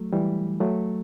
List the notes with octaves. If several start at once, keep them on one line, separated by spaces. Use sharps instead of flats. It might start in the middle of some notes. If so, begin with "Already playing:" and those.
Already playing: F#3 A3
E3 G3
F#3 A3